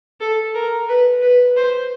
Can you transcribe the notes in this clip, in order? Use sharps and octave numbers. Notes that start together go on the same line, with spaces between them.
A4
A#4
B4
B4
C5